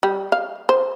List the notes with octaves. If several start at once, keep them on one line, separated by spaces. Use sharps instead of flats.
G3
F5
C5